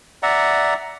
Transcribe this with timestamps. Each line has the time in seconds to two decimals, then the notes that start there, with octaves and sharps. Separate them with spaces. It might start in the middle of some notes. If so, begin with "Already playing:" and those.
0.23 D5 E5 F#5 A#5